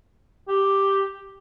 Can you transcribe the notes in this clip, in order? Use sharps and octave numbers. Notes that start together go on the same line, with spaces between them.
G4